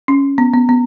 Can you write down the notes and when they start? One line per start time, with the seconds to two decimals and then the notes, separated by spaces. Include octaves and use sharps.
0.08 C#4
0.38 B3
0.54 B3
0.69 B3